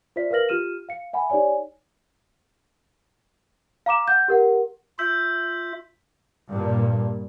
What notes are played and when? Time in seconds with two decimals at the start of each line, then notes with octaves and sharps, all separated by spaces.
0.16 F4 C5 D5 E5 B6
0.31 A#4 B4 F5 F6 A#6 F#7
0.49 F4 G4 F6 D#7 E7
0.89 F5 C#7
1.13 E5 F#5 G#5 B5
1.30 D#4 G4 C#5 D5 G#5
3.86 F5 A#5 D6 E7
4.08 F#5 G6
4.28 G4 A#4 F#5
4.99 F4 E5 E6 G6
6.49 G2 A#2